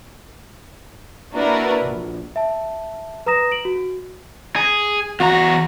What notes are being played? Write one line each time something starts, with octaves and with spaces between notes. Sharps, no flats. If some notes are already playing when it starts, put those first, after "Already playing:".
A#3 D4 E4 F#4 A#4 B4
A#1
E5 A5
B4 A#5 D#6 A#6 E7
D7 F#7
F#4
G#4
E2 F#4 A#5